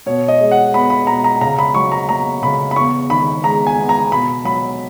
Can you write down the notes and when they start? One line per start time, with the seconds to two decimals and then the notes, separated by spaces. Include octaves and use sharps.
0.06 B2 C#5
0.28 D#5
0.40 G#3
0.51 F#5
0.74 B3 B5
0.90 B5
1.07 B2 A#5
1.24 A#5
1.41 C#3 A#5
1.59 B5
1.74 F#3 C#6
1.92 A#5
2.09 A#3 A#5
2.42 C#3 B5
2.71 B5
2.76 E2 C#6
3.10 D#3 B5
3.44 G#3 A#5
3.67 G#5
3.77 B3
3.89 A#5
4.12 B2 B5
4.45 F#3 B5